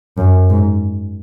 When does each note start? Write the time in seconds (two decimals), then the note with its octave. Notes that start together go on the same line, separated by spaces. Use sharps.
0.18 F#2
0.50 G#2